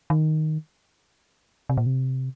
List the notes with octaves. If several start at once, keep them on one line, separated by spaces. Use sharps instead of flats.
D#3
C3
A#2
C3